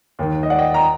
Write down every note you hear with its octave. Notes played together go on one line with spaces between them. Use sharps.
D#2 D#3
D#5
D5 F#5
D#5 G5
G5 A#5